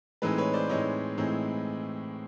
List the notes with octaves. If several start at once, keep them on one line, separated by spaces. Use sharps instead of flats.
A2 E3 G#3 C4 D#4 B4
B4 C#5
C5 D5
A2 E3 G#3 C4 D#4 C#5 D#5
A2 E3 G#3 C4 D#4